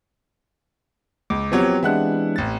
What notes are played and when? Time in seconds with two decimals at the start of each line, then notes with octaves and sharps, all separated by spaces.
1.30 C#2 D6
1.52 F3 F#3 B3 C4 G4 C#5
1.83 E3 G#3 D4 E4 F#5 F#6
2.36 A1 A6